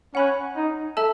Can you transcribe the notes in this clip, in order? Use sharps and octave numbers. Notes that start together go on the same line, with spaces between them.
C#4 F#5 B5 F#6
D#4
A4 E5 A5 E6